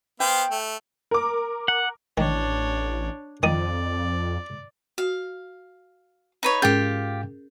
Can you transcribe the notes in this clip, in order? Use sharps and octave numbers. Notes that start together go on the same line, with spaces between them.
B3 C5 F5 G5
A3
A#4 D6
F#5
A1 D#3 D4 C#5
F2 D#3 D5 D#6
F#4 F5
D#4 B4 C#5
G#2 C#4 F4 G4 G#4 A#4 G5 G6